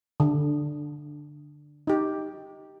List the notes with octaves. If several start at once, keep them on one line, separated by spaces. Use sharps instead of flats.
D3
D#4 G4